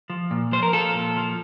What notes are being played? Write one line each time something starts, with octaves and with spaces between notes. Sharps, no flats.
F3
A#2
F3 C5
A#4
F3 F4 A4
A#2
F3